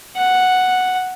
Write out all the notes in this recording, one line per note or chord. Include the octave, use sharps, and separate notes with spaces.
F#5